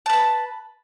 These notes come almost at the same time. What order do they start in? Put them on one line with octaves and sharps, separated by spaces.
A5 B4 B5